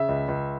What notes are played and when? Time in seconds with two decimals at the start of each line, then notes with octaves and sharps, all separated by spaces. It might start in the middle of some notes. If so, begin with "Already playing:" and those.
Already playing: C#3 E5
0.09 C#2
0.28 C#2